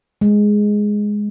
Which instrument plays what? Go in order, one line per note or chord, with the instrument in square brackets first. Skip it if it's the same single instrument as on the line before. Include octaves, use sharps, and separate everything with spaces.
[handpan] G#3